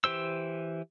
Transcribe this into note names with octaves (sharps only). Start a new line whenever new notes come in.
E3 G4 C5 E6